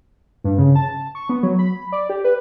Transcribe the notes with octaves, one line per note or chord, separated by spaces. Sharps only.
G2
C#3
A5
C#6
B3
F#3
B5
D5
G4
B4